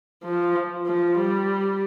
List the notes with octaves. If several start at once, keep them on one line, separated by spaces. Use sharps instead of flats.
F3
F3
G3